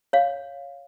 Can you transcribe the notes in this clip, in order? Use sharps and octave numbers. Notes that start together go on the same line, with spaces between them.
C#5 F5